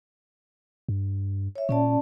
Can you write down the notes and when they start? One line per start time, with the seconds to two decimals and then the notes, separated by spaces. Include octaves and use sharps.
0.89 G2
1.56 C#5 E5
1.69 A#2 C#4 D5 A5